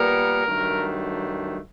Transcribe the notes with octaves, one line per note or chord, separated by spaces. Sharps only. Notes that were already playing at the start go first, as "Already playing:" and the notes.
Already playing: A#2 G3 B3 A#4
G2 D#3 F#3 A3